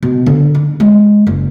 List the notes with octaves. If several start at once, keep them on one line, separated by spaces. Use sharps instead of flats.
B2
D3
D#4
G#3
F#1